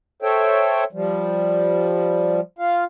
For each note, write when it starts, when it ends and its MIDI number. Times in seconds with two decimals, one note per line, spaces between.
0.22 0.84 69
0.22 0.84 72
0.22 0.84 73
0.22 0.84 76
0.22 0.84 79
0.93 2.40 53
0.93 2.40 55
2.59 2.84 65
2.59 2.84 77